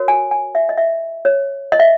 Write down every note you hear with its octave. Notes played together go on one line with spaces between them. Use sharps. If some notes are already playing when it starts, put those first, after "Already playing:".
Already playing: F#4 A#4 C#5
G#5
G#5
E5
D#5
E5
C#5
D#5
E5